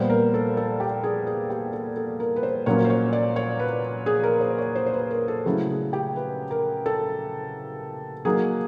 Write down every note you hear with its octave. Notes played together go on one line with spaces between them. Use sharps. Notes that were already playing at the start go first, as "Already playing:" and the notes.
Already playing: A#2 G3 B3 C5
A#4
A4
A4
G4
G#4
G#4
G4
A4
A4
A#4
B4
C5
A#2 F#3 A#3 C#4 C#5
C5
C#5
D5
C#5
B4
G#4
A#4
C5
C#5
C5
C5
B4
A#4
A4
C#3 F#3 A3 C#4 E4 G#4
G#4
G4
B4
A#4
A4
F#3 A#3 D#4 G#4